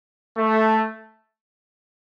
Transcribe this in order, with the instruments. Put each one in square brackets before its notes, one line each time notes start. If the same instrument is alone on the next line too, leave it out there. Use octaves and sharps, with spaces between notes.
[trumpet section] A3